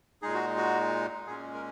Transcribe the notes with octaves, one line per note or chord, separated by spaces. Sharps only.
A#2 G#3 D#4 G#4
F#4
F#4
A#2 G#3 C#4 G#4
A#4